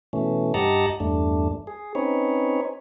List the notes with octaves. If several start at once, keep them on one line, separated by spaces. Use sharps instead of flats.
B2 E3 A3 C#4
G2 G4 D#5 F#5 A5 A#5
E2 G2 A3 D4
G#4
C4 C#4 D#4 B4 C#5